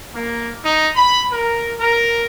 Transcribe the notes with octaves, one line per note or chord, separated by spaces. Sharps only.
A#3
D#4
B5
A#4
A#4